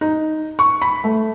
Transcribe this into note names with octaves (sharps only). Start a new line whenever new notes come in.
D#4
C#6
B5
A3